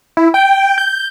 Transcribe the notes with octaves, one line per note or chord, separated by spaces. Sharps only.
E4
G5
G6